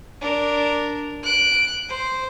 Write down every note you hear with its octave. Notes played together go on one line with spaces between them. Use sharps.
D4 A#4
F#6 D7
C5